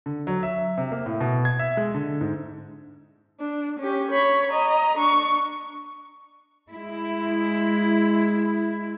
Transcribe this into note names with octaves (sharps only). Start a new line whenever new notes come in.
D3
F#3
E5
C3
A#3
A2
B2
G#6
E5
G#3
D3
G#2
D4
C#4 G4
C#5 B5
D#5 A#5
D4 C#6
G#3 E4